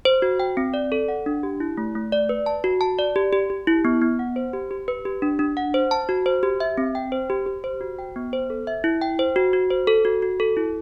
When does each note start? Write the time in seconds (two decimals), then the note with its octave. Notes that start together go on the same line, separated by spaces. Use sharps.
0.05 C5
0.22 F#4
0.40 G5
0.57 C4
0.74 D5
0.92 A4
1.08 F#5
1.26 D4
1.43 G4
1.60 E4
1.77 A3
1.95 A3
2.12 D5
2.29 B4
2.46 A5
2.64 F#4
2.81 A5
2.99 D5
3.16 G4
3.33 G4
3.50 G4
3.67 E4
3.85 B3
4.01 B3
4.19 F#5
4.36 C5
4.53 G4
4.71 G4
4.88 B4
5.05 G4
5.22 D4
5.39 D4
5.57 F#5
5.74 C5
5.91 A5
6.09 F#4
6.26 C5
6.43 G4
6.60 E5
6.78 C4
6.95 G5
7.12 C5
7.30 G4
7.46 G4
7.64 C5
7.81 F#4
7.99 G5
8.16 B3
8.33 C5
8.50 A4
8.67 E5
8.84 E4
9.02 G5
9.19 C5
9.36 F#4
9.53 F#4
9.70 C5
9.87 A4
10.05 F#4
10.22 F#4
10.40 A4
10.57 E4